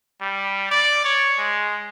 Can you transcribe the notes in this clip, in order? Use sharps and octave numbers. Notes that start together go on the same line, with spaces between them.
G3
D5
C#5
G#3